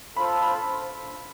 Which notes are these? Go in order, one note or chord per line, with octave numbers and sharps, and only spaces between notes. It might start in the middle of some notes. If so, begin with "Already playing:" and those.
F4 A4 C5 B5
B5